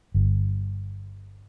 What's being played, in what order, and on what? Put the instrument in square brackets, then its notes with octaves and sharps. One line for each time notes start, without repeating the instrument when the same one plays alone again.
[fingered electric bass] G1